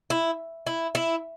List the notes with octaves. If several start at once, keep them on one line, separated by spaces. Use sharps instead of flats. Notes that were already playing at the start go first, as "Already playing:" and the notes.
E4
E4
E4